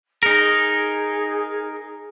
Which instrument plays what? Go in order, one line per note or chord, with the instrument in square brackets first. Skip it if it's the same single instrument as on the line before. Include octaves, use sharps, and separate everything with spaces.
[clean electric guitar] D#4 A#4 [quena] G#4